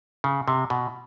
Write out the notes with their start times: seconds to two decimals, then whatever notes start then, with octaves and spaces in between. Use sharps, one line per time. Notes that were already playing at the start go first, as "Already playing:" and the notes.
0.24 C#3
0.48 C3
0.70 B2